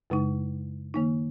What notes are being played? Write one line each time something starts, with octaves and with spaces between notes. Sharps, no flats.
F#2 C#3 G#3 D#4
D#3 A#3 D#4